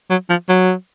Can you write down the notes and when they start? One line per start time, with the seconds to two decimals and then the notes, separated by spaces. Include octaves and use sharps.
0.10 F#3
0.30 F3
0.49 F#3